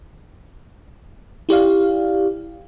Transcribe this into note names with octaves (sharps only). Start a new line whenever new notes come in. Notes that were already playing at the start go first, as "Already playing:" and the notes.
E4 G4 D5 F5